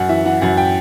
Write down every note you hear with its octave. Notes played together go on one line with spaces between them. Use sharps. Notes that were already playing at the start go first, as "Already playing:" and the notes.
Already playing: F#2 F#5
E3 E5
E3 F#5
F#2 F#5
G5